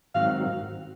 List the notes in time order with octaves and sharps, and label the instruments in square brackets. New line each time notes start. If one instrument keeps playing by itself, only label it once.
[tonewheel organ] G#2 D#3 F#3 C4 F#4 [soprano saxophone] F5